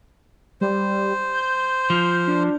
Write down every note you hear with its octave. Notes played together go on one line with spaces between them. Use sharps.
G3 C5
G6
F3
D4